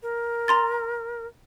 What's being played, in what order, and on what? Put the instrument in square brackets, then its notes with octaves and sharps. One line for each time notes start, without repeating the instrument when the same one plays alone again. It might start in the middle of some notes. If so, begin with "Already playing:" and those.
[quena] A#4
[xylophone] A#5 C6 A6